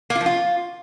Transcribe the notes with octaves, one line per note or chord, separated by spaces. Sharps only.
A#3
F4
F3
F4